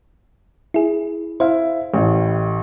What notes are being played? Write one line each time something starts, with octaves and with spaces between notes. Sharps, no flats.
E4 G#4
E4 C5 F5
A1 A2